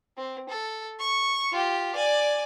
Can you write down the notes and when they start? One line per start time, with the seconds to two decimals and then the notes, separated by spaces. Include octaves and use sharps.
0.17 C4
0.49 A4
0.99 C#6
1.52 F4 G4
1.96 D5 G#5